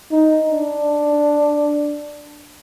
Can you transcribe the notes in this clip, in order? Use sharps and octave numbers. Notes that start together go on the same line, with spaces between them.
D#4
D4